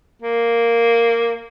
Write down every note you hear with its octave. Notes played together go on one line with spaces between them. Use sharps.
A#3